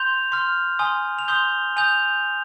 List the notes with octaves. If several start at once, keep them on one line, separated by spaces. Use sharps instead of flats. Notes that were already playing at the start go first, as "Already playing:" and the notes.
Already playing: C6 G6 F7
C6 F6
G#5 C6 D#6
F7
C6 D#6 G6 G7
G#5 D#6 G6 F7